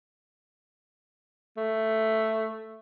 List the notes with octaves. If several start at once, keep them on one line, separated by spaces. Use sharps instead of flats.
A3